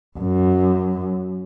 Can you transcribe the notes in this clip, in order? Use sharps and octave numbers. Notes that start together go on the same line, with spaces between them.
F#2